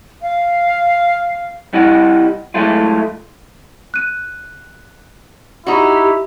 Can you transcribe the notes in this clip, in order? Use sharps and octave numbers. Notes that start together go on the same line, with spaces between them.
F5
C2 G3 E4 D#5 F#5
F#3 G#3 A3 E4 F4
F#6 D#7
D#4 E4 F#4 G4